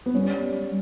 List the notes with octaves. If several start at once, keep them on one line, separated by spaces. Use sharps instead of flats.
B3
G3 C#4